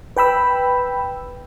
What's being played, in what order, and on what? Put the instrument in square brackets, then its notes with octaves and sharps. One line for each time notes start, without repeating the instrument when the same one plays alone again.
[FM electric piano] B4 G5 B5 E6